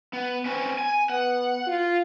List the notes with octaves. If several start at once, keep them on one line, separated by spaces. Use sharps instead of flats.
B3
C4 C#4 B4
G#5
B3 F#5
F4